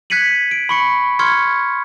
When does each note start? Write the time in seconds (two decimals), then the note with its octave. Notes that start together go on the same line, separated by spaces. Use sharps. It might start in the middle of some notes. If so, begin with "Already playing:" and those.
0.10 F#6 G#6 B6 C#7 D#7 F#7
0.51 D7
0.69 B5 C#6 C#7
1.19 C6 C#6 F6 G#6 C#7